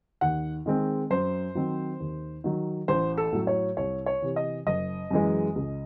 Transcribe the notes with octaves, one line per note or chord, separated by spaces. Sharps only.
D#2 F#5
D#3 G#3 C4
F#2 C5
D#3 F#3 C4
D#2
D#3 F#3
A1 C5
A4
A2 F#3
C#5
C2 C#5
C#5
C3 E3
D#5
F#1 D#5
F#2 E3 G#3
C#2